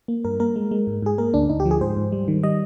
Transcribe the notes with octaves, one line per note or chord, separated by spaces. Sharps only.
A#3
G2 A#4
A#3 A#4
G#3
G#3
G#2
G#2 G#4
A#3 A#4
D2 D4
D2 D#4
G4
F3
G#4
G#2 C5
G#2
G3
D#3
G3 D#5